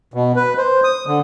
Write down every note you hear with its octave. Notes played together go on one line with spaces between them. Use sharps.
B2
B4
C5
D#6
D3